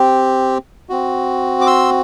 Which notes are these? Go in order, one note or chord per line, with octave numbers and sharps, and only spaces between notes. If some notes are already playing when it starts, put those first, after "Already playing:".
Already playing: C4 G4
C4 F#4
D6
C6 E6